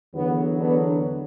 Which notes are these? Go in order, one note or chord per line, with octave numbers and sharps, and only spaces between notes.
E2 D3 F#3 B3
B3 D4